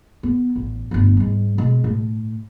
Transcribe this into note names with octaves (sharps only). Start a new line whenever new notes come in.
B3
A1
G1 D2
G#2 G3
B2 G#3
A2